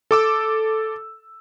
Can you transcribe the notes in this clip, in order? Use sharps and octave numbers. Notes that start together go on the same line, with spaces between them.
A4 D6 E6